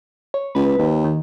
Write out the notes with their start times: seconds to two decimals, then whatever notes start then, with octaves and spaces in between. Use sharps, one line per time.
0.34 C#5
0.55 C#2 B4
0.78 D#2
1.04 D#3